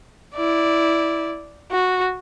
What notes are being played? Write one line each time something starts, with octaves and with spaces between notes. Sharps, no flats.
E4 D5
F#4